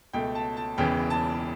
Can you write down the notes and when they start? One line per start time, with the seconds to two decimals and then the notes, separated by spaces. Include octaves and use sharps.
0.13 C#2 B2 A3 G5
0.35 A5
0.57 A5
0.77 E1 E2 C#3 E3 G5
1.10 A5